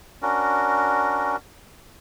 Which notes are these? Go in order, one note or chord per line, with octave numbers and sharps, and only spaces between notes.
C#4 D4 F#4 A#4